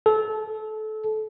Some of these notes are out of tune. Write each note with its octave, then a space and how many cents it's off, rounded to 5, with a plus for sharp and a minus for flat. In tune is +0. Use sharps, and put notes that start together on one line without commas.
A4 -25